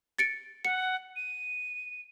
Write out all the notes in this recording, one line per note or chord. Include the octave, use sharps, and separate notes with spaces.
A6 C#7 D7
F#5 C#7
D#7